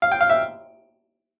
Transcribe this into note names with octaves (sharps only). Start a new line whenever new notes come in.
F5
G5
F5
E5